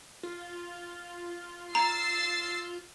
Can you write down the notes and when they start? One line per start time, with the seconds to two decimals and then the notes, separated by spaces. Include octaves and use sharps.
0.23 F4
1.75 A#5 E6 A6 C7